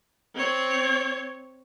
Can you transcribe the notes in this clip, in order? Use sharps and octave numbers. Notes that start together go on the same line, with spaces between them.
C4 C#5